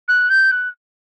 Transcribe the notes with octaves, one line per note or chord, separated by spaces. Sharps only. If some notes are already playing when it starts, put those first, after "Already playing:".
F#6
G6
F#6